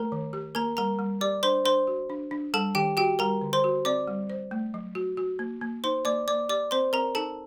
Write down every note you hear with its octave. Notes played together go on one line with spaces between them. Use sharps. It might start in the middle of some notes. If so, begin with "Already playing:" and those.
Already playing: A3 A#4 A#5
D#3
G4
A#3 A#4 A#5
G3 A#4 A#5
G3
G4 D5 D6
D4 C5 C6
D4 C5 C6
F#4
D4
D4
G3 A4 A5
D#3 G4 G5
F#4 G4 G5
G3 A#4 A#5
D3
C5 C6
F#4
C4 D5 D6
G3
C5
A3
F#3
F#4
F#4
A#3
A#3
D#4 C5 C6
A#3 D5 D6
A#3 D5 D6
G4 D5 D6
C4 C5 C6
C4 A#4 A#5
D#4 A4 A5